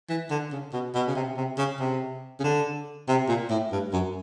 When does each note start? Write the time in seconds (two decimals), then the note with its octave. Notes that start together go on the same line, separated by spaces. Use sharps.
0.09 E3
0.30 D3
0.52 C#3
0.73 B2
0.95 B2
1.07 C#3
1.15 C3
1.37 C3
1.58 C#3
1.80 C3
2.40 C#3
2.44 D3
3.08 C3
3.29 A#2
3.50 A2
3.72 G2
3.93 F#2